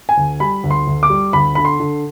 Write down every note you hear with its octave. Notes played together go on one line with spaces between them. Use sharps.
G#5
D2
G3 B5
D2
C6
D2
D6
G3
D2 B5
D3 B5
C6
D3